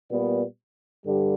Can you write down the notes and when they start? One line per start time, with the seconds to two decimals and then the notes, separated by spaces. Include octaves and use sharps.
0.11 A#2 G3 B3
1.06 G2 D3 G3